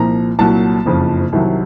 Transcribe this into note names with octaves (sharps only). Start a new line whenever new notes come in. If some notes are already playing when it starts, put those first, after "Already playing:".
Already playing: C2 A#2 F3 A#5
C2 A#2 F#3 A5
F#1 F2 C#3 F3
C2 C3 D#3 F#3